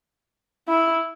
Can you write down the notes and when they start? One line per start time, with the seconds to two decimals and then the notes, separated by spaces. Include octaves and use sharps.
0.68 E4